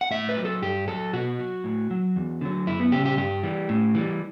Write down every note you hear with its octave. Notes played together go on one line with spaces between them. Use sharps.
F#5
A2 E5
B4
F#3
A4
G2 G4
F#3 A4
B2 F#4
F#3
A2
F#3
E2
D3 F#3
F#2 E4
B3
C#3 G3 G4
G4
G2 G4
E3 G3
A2
E3 G3